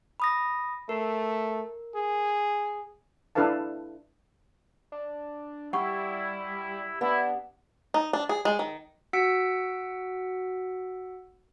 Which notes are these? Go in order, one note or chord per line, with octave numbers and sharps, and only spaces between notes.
B5 D#6 A#6
A3 A#4
G#4
D4 E4 A4 B4 F5 A5
D4
G3 E4 G4 F#5 C#6
B3 D4 E4
D#4
D4
G#4
G#3
D#3
F#4 F#5 E6 B6 C#7 D7